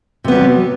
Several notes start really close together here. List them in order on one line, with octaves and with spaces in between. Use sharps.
C3 B3 G3 F#3